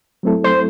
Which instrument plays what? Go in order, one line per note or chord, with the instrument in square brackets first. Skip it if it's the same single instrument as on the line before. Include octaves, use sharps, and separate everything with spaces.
[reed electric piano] F#3 A3 C4 E4 A4
[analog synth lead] C5